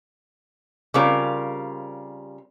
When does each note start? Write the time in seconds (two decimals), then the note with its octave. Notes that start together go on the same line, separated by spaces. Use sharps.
0.94 C#3 G3 C4 F4 A#4